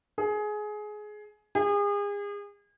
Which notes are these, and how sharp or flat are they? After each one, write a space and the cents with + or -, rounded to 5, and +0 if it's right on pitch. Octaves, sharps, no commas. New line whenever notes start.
G#4 +20
G#4 -35